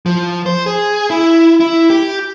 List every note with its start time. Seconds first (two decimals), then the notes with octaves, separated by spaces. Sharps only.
0.06 F3
0.46 C5
0.66 G#4
1.10 E4
1.60 E4
1.90 G4